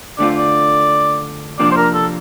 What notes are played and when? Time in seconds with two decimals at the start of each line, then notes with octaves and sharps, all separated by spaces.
0.18 D3 A3 C4 F4 D5
0.37 D5
1.59 C3 F3 A#3 D4 D5
1.71 C5
1.77 A#4
1.94 A4